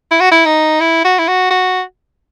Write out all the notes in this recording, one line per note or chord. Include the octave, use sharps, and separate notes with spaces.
E4
F#4
E4
D#4
E4
F#4
E4
F#4
F#4